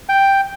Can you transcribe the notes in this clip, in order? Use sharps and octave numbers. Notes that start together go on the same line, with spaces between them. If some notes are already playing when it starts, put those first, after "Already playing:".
G5